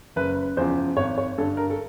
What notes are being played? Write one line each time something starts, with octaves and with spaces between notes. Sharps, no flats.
F#1 B4
E2 C#3 F3 C5
G#1 C#5
C#5
G2 D3 A4
A#4
A4